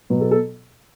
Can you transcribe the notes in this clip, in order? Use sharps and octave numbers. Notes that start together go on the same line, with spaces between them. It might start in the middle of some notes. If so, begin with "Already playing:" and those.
B2 F#3 B3
A4
A4